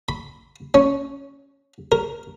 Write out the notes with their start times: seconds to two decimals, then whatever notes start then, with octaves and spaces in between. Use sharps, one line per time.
0.09 B5
0.74 C#4
1.92 A#4